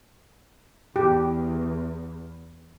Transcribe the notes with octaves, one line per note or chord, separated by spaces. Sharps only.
E2 G4